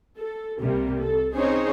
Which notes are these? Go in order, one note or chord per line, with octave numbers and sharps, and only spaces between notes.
A4
C2 C3 G3 A#3
A4
C4 C#4 D#4 G#4 C5 C#5